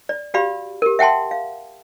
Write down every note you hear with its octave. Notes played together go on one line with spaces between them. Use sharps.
D5
F#4 G4 D5 F5 B5
G4 A#4
E5 F#5 G5 A5 C6
F5